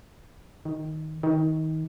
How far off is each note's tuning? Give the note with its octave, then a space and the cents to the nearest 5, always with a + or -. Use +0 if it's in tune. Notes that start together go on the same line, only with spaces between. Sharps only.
D#3 +5
D#3 +25